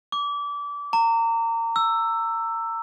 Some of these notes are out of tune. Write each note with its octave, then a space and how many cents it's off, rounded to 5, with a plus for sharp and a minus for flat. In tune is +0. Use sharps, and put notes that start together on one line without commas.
D6 -25
A#5 -30
E6 +10